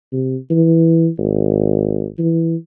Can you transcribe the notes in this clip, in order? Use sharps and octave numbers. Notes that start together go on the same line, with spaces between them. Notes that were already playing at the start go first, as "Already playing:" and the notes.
C3
E3
G#1
E3